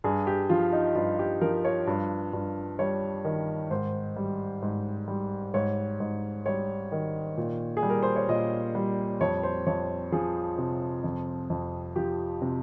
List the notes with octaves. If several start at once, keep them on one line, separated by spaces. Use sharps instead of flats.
G2 G#4
G4
F3 F4
D#4
G2 F4
G4
F3 A#4
C#5
G2
G2
G3 C#5
D#3
G#2 C5
G3
G#2
G3
G#2 C#5
G#2
G3 C#5
D#3
A#2
G#4
G3
A#4
C5
C#5
A#2 D#5
G3
F2 C#5
C5
F2 C#5
F3 G#4
C3
F2
F2
F3 G4
C3